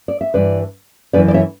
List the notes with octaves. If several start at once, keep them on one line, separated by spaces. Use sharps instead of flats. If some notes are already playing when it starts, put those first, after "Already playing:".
D5
E5
G2 E3 B4 D5
F#2 E3 B4 D5
D5
C#5 E5